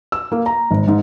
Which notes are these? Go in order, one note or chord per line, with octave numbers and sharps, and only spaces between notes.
E6
A#3
A#5
G#1
G#2